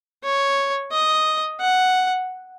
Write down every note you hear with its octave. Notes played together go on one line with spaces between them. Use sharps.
C#5
D#5
F#5